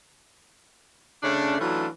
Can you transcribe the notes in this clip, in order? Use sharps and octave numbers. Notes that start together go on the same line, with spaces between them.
C#3 A3 C#4 D4
E3 F#3 A3 C#4 D4 F4